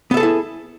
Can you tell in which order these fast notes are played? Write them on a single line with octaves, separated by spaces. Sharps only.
B3 E5 A4 G#4 E4